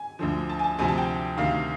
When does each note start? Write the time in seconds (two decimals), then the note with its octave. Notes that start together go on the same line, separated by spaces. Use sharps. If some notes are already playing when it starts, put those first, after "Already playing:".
Already playing: G#5
0.19 D2 D3 F3
0.49 A5
0.59 G#5
0.64 A5
0.79 D2 C3 F3 G#5
0.88 A5
0.98 G5
1.37 D2 C3 D#3 F5